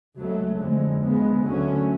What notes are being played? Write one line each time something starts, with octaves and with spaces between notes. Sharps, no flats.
C#2 C#3 F#3 A3
F2 D3 G#3
D2 C#3 G#3 B3
D2 D3 F#3 A3 C#4